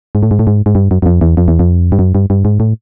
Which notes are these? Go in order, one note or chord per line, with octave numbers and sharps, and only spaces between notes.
G#2
A2
G#2
A2
G#2
G#2
G2
F#2
F#2
F2
E2
F2
E2
F2
G2
F#2
G2
G2
G#2
A2